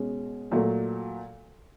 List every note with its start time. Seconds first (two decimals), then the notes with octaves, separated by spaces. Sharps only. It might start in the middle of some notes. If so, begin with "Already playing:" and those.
Already playing: B2 G#3 C#4
0.52 A#2 F#3 A3